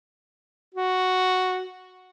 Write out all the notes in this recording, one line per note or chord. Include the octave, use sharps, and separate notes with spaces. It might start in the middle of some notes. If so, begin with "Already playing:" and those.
F#4